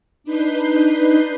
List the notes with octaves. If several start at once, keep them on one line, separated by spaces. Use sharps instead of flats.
D4 D#4 B4 G6 C7